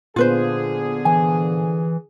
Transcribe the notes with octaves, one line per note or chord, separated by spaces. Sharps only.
A#2 D3 F3 B3 F4 G#4 B4 C5
E3 G#5